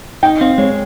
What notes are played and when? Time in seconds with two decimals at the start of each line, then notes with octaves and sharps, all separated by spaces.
0.23 D#4 G5
0.41 C4 F5
0.58 G#3 C#5